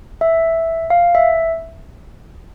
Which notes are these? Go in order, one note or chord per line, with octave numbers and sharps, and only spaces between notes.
E5
F5
E5